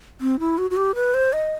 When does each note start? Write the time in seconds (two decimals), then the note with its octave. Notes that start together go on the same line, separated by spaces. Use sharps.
0.21 C4
0.40 E4
0.58 F#4
0.70 F#4
0.77 G4
0.95 B4
1.14 C5
1.33 D#5